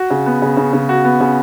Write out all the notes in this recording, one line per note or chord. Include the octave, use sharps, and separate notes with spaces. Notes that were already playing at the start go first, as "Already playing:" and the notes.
Already playing: F#4
C#3
B3
C#3
C#3
C#3
F#4
B3
C#3